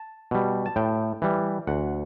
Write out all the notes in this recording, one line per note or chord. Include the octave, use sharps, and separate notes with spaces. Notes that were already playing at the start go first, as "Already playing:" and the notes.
Already playing: A5
B2 G3
A5
A2 G5
E3 G3
D2 F#5